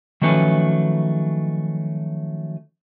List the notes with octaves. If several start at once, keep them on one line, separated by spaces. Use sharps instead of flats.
D#3 F3 F#3 A3 C#4 B4